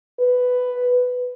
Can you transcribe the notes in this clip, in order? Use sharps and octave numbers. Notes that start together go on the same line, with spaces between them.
B4